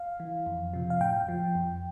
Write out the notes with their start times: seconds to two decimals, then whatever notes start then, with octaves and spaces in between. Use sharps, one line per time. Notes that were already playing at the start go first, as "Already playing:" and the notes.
Already playing: F5
0.20 E3
0.46 F2
0.74 C3 F3
0.90 F5
1.00 A2 G5
1.29 F3
1.55 F2